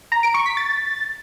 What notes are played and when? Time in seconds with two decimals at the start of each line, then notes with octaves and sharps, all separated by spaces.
0.12 A#5
0.23 D7
0.34 C#6
0.46 B6
0.57 A6